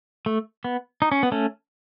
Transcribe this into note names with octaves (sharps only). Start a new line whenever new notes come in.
A3
B3
D#4
C#4
B3
A3 C#4